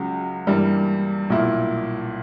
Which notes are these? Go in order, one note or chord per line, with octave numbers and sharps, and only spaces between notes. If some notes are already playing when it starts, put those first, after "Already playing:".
Already playing: C#2 C#3 F#3
G2 E3 G3 A#3
B1 A#2 A#3 E4